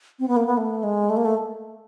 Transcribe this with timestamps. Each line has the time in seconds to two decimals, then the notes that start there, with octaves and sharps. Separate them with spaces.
0.19 C4
0.28 B3
0.36 A#3
0.47 B3
0.57 A3
0.83 G#3
1.10 A3
1.17 A#3
1.25 A3